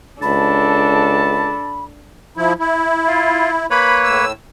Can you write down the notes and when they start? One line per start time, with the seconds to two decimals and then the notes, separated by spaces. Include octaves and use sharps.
0.22 C#2 D4 A4 A5 B5
2.37 F3 E4
2.59 E4
3.08 F4
3.70 A#3 B4 C#5 B5
4.04 A2 E6